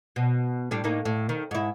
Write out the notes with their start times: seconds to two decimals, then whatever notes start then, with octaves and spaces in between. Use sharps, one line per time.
0.16 B2
0.71 A2 G3 D4
0.84 A2 A#3 D#4
1.05 A2
1.29 D#3
1.51 G#2 E4